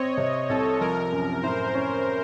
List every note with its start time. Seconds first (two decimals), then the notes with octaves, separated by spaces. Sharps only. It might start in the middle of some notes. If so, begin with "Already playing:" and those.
Already playing: C4 C#5 D#5
0.17 C3
0.49 C2 A4
0.81 F3 A#4
1.12 F#2
1.43 A2 C5
1.75 C#4